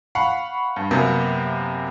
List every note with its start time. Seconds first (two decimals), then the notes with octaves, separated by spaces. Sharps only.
0.15 F5 F#5 B5 C#6
0.76 G2
0.91 F#2 C3 F#3 A#3 B3